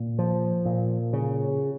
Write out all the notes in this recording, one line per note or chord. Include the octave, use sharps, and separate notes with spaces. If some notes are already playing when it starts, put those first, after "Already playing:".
Already playing: A#2
F3
A#2
C#3